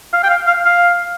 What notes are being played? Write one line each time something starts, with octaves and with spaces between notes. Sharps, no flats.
F5
G5
F5
F5
F5